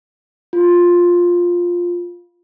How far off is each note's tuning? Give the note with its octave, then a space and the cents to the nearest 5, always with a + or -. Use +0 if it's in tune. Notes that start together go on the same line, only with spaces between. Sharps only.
F4 +10